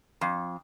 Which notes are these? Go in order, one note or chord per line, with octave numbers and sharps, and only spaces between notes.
F2